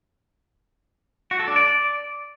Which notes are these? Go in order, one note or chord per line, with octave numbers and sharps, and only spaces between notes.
F#4
A4
D4
D5